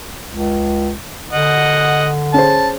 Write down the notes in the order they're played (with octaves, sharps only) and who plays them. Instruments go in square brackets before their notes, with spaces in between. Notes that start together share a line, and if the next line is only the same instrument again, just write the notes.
[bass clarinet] C#2
[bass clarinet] D3 [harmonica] D#5 F#5
[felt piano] C#4 G#4 C5 [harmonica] A5